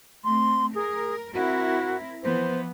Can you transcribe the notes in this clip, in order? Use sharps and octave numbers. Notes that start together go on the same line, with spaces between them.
A3 C4 C6
G#4 A#4
C4 E4 F#4 A#4
E3 F3 B3 C5